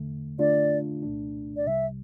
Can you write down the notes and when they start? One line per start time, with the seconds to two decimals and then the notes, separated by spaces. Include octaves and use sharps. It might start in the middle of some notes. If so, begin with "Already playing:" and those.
Already playing: E2 D3 A3
0.39 D3 A3 D4 F4 D5
1.03 C2 A#2 A3 D4
1.57 D5
1.66 C2 C3 G3 E5